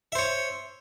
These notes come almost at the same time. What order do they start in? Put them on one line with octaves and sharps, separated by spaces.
E5 C5 C#5